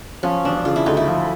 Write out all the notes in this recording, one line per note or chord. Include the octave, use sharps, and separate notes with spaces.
F3 C#4
E1 D4
C#3 F4
E4
D2 D#4
E4
F3